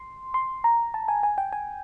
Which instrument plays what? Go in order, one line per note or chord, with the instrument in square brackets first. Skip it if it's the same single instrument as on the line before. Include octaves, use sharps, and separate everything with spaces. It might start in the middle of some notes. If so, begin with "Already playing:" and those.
Already playing: [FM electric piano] C6
C6
A#5
A5
G#5
G#5
G5
G#5